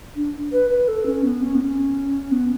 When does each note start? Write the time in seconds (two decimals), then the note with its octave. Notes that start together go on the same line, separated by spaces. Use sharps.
0.16 D4
0.52 B4
0.70 B4
0.88 A4
1.06 C#4
1.25 B3
1.42 C#4
1.55 B3
1.61 C#4
2.32 B3